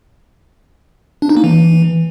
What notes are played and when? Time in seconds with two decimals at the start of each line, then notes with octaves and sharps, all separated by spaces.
1.22 D4
1.29 D#4
1.37 A#3
1.44 E3